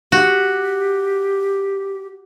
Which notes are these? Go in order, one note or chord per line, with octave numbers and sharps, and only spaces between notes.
F#4 G4